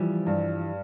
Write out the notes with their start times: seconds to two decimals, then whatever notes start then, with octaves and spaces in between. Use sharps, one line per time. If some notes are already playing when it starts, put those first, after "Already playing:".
Already playing: E3 F3 G3
0.26 G2